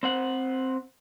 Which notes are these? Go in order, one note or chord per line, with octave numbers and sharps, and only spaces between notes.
C4 C5 F#5